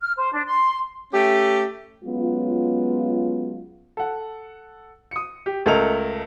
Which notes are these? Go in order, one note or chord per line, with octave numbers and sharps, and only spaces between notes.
F6
C5
D4
C6
A3 C#4 G4
F#3 G#3 B3 C#4 F4
A4 F#5
D#6 C#7
G4
C#2 A3 A4 A#4 D#5 F7